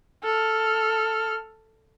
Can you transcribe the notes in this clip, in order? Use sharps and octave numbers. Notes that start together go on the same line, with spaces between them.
A4 F6